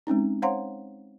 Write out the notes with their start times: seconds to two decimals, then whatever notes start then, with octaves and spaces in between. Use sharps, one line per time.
0.07 G#3 C4 C#4 D#4
0.42 C5 C#5 F5 F#5 A#5 C6